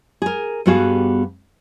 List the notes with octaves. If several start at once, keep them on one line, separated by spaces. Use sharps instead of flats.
G#4 A#4
G2 G3 B3 F#4 G#4 F5